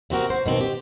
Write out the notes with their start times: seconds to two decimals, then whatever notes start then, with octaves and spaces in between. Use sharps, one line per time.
0.10 C3 C4 F#4 A#4
0.30 C5
0.46 B2 D#3 C4
0.61 G4